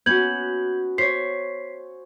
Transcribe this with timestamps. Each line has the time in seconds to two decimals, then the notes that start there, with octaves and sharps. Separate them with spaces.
0.06 B3 C#4 F#4 G6 G#6 F#7
0.98 C5 C#5 B6 C7